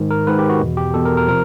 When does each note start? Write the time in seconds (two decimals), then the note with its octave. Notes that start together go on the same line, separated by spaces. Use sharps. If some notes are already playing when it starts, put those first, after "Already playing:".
Already playing: G#2 D#3
0.11 A#4
0.27 G#2 D#3 B4
0.39 G4
0.49 F#4
0.60 E2 B2
0.77 G4
0.94 E2 B2 A4
1.05 A#4
1.17 A#4
1.28 C3 F3 A#4